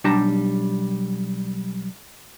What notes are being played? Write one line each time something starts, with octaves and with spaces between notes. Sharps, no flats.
B1 G3 D4 G4 A5 A#5